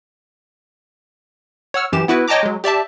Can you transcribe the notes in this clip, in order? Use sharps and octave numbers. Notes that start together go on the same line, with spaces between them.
C#5 F#5 E6 F6
F#2 E3 G4 E7
B3 E4 F#4 B4
C#5 D#5 G5 A5 A#5 D6
F#3 G#3
G4 D5 E5 A5